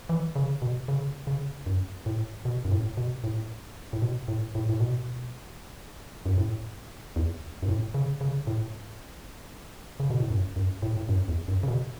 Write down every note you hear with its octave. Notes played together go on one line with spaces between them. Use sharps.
E3
C#3
B2
C#3
C#3
F#2
A2
B2
F#2
A2
B2
A2
A2
B2
A2
A2
A2
B2
F#2
A2
E2
F#2
A2
C#3
C#3
A2
C#3
B2
A2
F#2
F#2
A2
A2
F#2
E2
F#2
C#3
B2